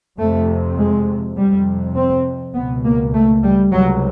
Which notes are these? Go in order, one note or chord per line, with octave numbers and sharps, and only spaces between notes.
F2 C3 A3
G#3
F2 C3 G3
C4
C#2 B2 B3
A#3
A3
G3
C#2 C3 F#3